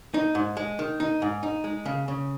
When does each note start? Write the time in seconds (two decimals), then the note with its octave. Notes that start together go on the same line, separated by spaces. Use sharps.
0.14 D#4
0.35 G#2
0.57 G#3
0.79 D#3
1.00 D#4
1.22 G#2
1.43 D#4
1.64 G#3
1.85 C#3
2.08 C#3